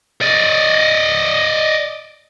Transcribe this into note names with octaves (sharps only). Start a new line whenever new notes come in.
D5 D#5